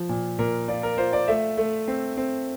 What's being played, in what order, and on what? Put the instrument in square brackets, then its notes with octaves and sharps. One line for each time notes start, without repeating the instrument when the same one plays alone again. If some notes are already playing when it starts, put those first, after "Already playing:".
Already playing: [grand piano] F3
A#2
A#2 A#4
F4 D5
A#4
F4 C5
D5
A3 E5
A3
C4
C4